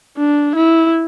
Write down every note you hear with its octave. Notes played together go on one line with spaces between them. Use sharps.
D4
E4